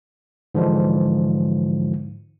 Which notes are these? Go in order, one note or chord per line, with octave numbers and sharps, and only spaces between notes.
G#2 D3 E3 F3 G#3